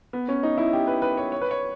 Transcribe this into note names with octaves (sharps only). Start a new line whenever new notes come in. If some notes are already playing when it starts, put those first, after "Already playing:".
B3
C#4
D#4
E4
G4
B4
B4
C#5
C#5
B4
C#5